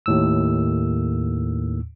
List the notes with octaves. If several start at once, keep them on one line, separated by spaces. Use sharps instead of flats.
D#2 A2 E6